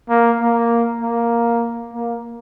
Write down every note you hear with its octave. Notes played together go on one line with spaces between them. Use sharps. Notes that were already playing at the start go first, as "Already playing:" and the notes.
A#3
A#3
A#3
A#3